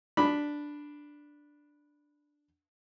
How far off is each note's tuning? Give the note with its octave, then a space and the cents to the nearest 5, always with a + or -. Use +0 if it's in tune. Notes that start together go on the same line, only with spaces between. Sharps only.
D4 +0 B5 +0